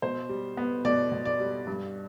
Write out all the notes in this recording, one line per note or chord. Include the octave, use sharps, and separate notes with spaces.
B2 C5
G3
B3
B2 D5
B2
D5
G3
G2